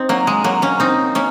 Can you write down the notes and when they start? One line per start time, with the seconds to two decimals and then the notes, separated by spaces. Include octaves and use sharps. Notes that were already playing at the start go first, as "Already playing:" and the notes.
Already playing: C4 D#4
0.09 F#3 A#3
0.27 G#3
0.44 F#3 A#3
0.62 A#3 C#4
0.80 C4 D#4
1.15 A#3 C#4